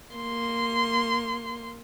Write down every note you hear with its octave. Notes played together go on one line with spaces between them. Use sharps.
A#3 C6